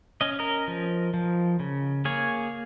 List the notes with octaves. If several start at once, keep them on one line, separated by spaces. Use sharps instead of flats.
C#4 D#5
A#4 D#5
F3
F3
C#3
A#3 G#4 C#5